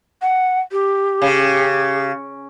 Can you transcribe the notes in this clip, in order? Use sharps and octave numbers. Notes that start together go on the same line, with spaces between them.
F#5
G4
C#3